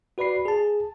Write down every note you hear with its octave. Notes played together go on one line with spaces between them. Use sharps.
F#4 B4 D5 B5 C7
G#4 A5